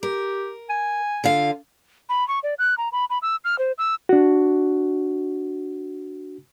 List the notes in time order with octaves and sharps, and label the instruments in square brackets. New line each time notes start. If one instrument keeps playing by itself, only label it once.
[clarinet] G4 [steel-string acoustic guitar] A#4
[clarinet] G#5
[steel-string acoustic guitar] D3 F4 F5
[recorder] B5
C#6
D5
F#6
A#5
B5
B5
E6
F6
C5
E6
[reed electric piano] D4 F#4